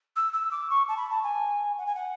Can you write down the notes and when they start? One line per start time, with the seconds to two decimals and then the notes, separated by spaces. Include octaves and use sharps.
0.16 E6
0.33 E6
0.51 D6
0.70 C#6
0.88 A5
0.97 B5
1.10 A5
1.24 G#5
1.78 F#5
1.86 G#5
1.95 F#5